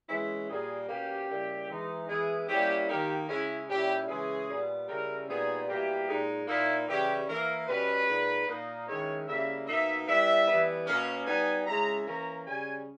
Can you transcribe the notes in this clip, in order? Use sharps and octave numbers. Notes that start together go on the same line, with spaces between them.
E3 G#3 C#4 E4
A#2 G3 A#3 G#4
B2 A#3 C#4 G4
C#3 G3 A#3 E4
E3 G#3 D#4
E3 G#3 B3 E4 G#4
G3 A#3 C#4 E4 G4
D#3 A#3 D#4 G4
C#3 G#3 C#4 E4
A#2 G3 C#4 E4 G4
C#3 E3 G#3 C#4 G#4
A#2 G3 B3
C#3 G3 C#4 E4 A#4
A#2 G3 B3 D#4 G#4
B2 G3 A#3 E4 G4
A#2 G#3 D#4
A#2 A#3 D#4 E4
C#3 E3 G3 C#4 E4 G4
E3 A#3 E4 A#4
B2 G3 C#4 B4
A#2 G#3 D#4
A#2 A#3 D#4
D#3 G#3 C#4 E4 C#5
C#3 G3 A#3 E4 E5
B2 A#3 D#4 E5
G3 B3 E4 E5
E3 G3 B3
B2 A#3 C#4
G3 B3 D#4 G#5
C#3 G#3 C#4 E4 A#5
E3 A#3 C#4 A#5
C#3 G3 C#4 G#5